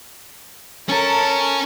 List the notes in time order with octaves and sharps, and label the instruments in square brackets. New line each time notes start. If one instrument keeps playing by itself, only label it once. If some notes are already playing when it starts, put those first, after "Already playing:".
[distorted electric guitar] C#4 C#5 [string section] A4 A#4